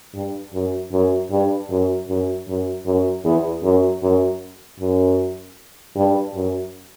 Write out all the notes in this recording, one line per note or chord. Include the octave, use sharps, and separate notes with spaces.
G2
F#2
F#2
G2
F#2
F#2
F#2
F#2
E2
F#2
F#2
F#2
G2
F#2